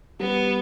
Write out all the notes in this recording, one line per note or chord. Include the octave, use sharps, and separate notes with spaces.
G3 B3